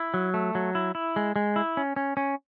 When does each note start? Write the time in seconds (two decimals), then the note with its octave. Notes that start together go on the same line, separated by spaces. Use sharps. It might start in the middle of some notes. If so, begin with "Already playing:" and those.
Already playing: E4
0.14 F#3
0.34 A3
0.55 F#3
0.75 E4
0.95 E4
1.16 G#3
1.36 G#3
1.56 E4
1.77 C#4
1.96 C#4
2.17 C#4